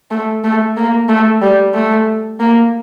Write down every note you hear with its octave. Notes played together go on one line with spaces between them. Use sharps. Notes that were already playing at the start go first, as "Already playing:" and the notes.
A3
A3
A#3
A3
G3
A3
A#3